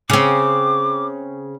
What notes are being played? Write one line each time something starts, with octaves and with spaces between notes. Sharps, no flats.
C#3 C4 D6